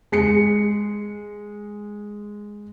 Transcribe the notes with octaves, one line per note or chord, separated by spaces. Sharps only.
G#3 C7 C#7